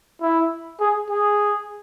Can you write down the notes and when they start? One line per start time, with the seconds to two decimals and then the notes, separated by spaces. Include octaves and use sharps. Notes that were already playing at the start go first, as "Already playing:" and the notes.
0.22 E4
0.80 G#4
1.10 G#4